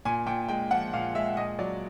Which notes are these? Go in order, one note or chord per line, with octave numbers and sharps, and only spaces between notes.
A#2 G#5
A#2 G5
G#3 G5
F3 F#5
A#2 F5
G#3 E5
A#2 D#5
F#3 D5